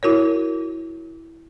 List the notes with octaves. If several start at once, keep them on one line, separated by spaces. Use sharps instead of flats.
E4 F#4 A#4 C#5